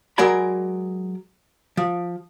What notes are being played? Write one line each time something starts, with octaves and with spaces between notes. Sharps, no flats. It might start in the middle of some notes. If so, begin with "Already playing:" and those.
F#3 G#3 A#4 D5 G#5 B5
F3